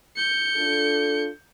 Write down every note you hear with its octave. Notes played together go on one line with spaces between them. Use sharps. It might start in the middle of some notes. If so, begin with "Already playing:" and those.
G6 C#7
D4 F4 A4